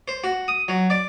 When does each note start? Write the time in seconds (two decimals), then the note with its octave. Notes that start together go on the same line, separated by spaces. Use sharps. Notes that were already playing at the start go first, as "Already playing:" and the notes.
0.08 C5
0.24 F#4
0.48 D#6
0.68 F#3
0.90 D5